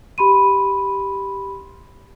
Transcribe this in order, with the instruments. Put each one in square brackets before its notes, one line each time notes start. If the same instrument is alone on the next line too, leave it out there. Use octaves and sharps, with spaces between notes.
[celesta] G4 B5 C6 D#7